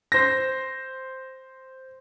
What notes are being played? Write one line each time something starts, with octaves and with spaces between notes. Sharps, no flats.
C5 A#6